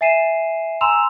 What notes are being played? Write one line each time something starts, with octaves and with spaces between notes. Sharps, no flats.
E5 G#5 C7 D#7 E7
G#5 A#5 C6 E6 E7 F7